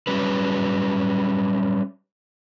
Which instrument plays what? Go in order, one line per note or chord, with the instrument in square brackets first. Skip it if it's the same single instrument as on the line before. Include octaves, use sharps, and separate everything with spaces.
[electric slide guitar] F#3 G3 C#4 B4